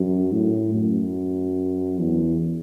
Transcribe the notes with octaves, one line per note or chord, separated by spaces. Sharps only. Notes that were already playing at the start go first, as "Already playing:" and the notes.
Already playing: F#2
A2
F#2
E2